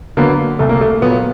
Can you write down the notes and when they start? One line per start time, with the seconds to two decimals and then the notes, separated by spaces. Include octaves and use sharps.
0.17 D3 F#3 A#3 B3
0.59 C2 A3
0.69 A#3
0.81 A3
1.02 A#2 F#3 B3